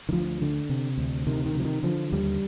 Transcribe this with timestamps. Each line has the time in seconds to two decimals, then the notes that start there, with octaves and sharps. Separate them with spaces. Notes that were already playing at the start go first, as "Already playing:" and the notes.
0.09 D#3
0.12 D2 F3
0.42 D3
0.69 C3
0.98 D2
1.27 C3 D#3
1.46 D#3
1.54 C3
1.60 F3
1.65 D#3
1.83 D3 F3
2.12 D#2 G3